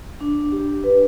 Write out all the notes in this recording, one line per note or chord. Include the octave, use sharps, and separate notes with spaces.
D4
G4
B4